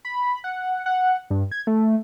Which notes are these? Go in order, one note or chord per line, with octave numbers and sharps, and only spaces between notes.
B5
F#5
F#5
G2
G#6
A3